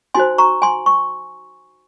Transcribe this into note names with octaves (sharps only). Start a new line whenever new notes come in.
D#4 F#4 C5 G#5 C6
A#5 C#6
G#5 C6
C#6